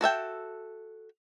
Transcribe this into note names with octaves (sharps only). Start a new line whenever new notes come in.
F#4 A4 E5 G5